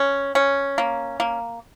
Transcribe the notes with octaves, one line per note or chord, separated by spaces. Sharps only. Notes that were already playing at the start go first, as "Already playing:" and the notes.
Already playing: C#4
C#4
A#3
A#3